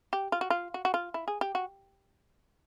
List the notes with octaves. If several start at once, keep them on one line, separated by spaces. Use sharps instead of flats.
G4
F4
F#4
F4
F#4
F#4
F4
E4
G#4
G4
F#4